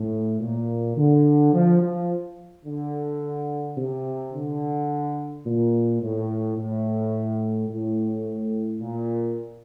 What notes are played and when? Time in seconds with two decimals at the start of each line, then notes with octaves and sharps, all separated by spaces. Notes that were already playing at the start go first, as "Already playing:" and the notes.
Already playing: A2
0.41 A#2
0.97 D3
1.54 F3
1.82 F3
2.65 D3
3.78 C3
4.33 D3
5.45 A#2
6.01 A2
6.57 A2
7.70 A2
8.82 A#2